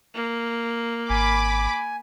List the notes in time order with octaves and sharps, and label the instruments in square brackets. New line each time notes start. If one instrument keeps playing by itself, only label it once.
[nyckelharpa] A#3
[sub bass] G#1 [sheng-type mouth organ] G#5 [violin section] B5 D6